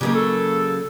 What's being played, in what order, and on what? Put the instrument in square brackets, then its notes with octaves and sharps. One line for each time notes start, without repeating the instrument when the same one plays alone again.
[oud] C#3 F#3 A#3 [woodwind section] D#4 G4
[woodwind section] A4